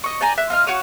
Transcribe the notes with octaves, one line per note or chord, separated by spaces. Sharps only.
D#5 C#6
D5 G5 G#5 A#5
E5 F#6
F4 D#5 F6
F#4 C#5 F5 D#6